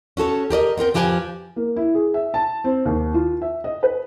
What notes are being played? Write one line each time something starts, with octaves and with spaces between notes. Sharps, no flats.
C#4 F#4 A4 C#5
G4 A#4 D5 D#5
B3 C4 A#4 G5
F2 F3 G4 B4 G5 G#5
A#3
E4
G#4
E5
A5
C4
D#2
F4
E5
D#5
B4